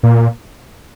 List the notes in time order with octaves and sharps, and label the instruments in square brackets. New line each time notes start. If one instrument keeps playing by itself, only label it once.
[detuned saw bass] A#2